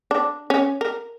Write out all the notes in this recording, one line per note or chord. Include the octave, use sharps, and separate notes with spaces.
D4
C#4
A#4